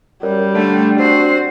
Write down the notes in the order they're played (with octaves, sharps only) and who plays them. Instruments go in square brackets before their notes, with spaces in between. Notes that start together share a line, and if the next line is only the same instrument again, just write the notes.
[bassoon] F#2 [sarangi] G3
[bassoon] D3 [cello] A3 [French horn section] D4
[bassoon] C4 [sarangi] F#4 [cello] C5